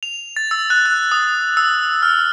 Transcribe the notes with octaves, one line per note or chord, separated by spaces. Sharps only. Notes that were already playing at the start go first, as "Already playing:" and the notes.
F7
A6
E6
F#6
F#6
D#6
E6
F6